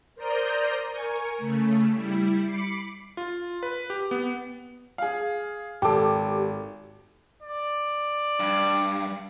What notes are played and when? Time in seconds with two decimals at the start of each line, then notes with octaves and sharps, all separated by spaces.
0.15 A#4 C5 D5 A#5 D#6 G6
0.92 A#4 G#5 C#6
1.38 C#3 A3
1.92 G3 E4
2.42 B5 D6 C7 C#7
3.17 F4
3.63 B4
3.90 G4
4.11 B3
4.98 G#4 F5
5.82 G#1 G4 A4 D6
7.42 D5
8.40 G2